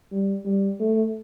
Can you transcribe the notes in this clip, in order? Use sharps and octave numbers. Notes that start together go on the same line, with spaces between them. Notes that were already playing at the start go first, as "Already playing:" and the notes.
G3
G3
A3